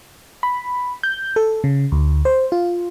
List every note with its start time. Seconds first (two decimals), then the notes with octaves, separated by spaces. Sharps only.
0.43 B5
1.03 G6
1.36 A4
1.64 C#3
1.92 D2
2.25 C5
2.52 F4